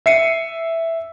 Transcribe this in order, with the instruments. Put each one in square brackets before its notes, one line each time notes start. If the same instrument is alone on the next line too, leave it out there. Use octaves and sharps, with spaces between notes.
[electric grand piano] E5 C7 C#7 D#7